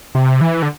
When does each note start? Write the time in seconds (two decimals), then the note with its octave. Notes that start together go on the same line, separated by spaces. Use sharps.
0.15 C3
0.41 E3
0.62 D3